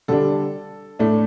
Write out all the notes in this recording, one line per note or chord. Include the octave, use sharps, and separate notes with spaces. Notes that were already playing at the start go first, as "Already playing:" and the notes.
D3 G3 D4 A4
A2 A3 D4